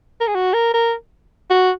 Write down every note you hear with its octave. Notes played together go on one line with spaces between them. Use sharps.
A#4
G#4
F#4
A#4
A#4
F#4